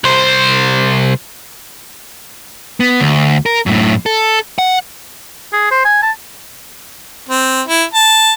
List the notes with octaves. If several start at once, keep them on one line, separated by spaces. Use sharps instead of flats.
C2 C5
B3
D2
A#4
F#2 A2
A4
F#5
G#4
C5
G#5
A5
C4
E4
A5